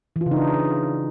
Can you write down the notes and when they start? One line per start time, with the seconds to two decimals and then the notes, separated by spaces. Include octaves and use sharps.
0.16 E3
0.21 F4
0.26 C#3
0.31 D#4
0.37 D4